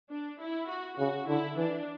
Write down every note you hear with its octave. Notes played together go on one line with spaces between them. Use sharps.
D4
E4
F#4
C#3 F#4
D3 E4
E3 D4